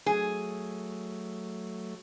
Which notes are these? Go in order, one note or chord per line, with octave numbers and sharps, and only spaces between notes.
F#3 A3 G#4